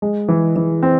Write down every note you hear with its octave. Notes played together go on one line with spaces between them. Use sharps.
G#3
E3
E3
C4